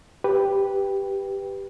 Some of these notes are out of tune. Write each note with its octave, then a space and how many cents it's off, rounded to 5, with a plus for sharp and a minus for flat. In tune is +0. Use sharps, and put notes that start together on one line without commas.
G4 +0 B4 +0